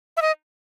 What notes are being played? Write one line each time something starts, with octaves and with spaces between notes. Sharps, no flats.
E5
D#5